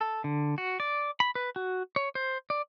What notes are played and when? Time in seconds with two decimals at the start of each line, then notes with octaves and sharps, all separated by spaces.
0.01 A4
0.24 D3
0.58 F#4
0.80 D5
1.20 B5
1.35 B4
1.56 F#4
1.96 C#5
2.15 C5
2.50 D5